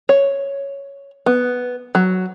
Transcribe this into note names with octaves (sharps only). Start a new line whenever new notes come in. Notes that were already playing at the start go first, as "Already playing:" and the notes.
C#5
B3
F#3